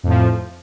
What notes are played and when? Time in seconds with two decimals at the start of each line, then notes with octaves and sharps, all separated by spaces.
0.04 F2
0.06 A2
0.09 F3